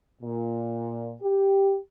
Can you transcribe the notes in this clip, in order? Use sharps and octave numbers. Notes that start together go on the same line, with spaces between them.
A#2
G4